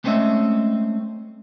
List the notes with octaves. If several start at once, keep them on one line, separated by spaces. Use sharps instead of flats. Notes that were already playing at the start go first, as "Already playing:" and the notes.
G#3 A3 C4 C#4 D#5 E5